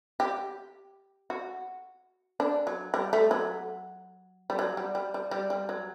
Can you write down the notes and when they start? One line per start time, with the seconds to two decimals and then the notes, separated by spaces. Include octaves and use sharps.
0.20 G4
1.30 F#4
2.40 D4
2.67 F#3
2.94 G3
3.13 A3
3.31 F#3
4.50 G3
4.59 F#3
4.77 G3
4.95 G3
5.14 G3
5.31 G3
5.50 G3
5.69 F#3